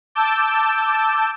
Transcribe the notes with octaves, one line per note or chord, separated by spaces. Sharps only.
A5 D6 E6 G6